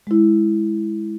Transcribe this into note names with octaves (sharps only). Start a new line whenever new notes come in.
G#3 E4